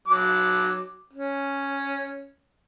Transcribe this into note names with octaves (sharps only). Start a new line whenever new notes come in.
F#3 D6
C#4